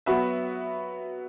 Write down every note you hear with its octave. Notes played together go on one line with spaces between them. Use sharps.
F#3 B3 F#4 B4 E5